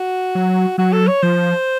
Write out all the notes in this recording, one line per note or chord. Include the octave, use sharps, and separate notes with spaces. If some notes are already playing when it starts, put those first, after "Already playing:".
Already playing: F#4
F#3
F#3 F#4
A4
C#5
F3 C5